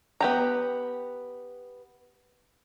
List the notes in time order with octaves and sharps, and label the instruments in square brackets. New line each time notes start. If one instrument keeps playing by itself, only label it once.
[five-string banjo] B3 G4 A#5